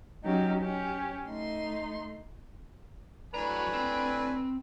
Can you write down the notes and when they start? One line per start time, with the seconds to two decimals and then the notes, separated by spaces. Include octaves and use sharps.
0.23 F#3 C#4 D#4 G4
0.61 C#4 G4
1.26 A3 D#4 C6
3.34 A2 D4 F#4 B4 G#5 A#5
3.74 C4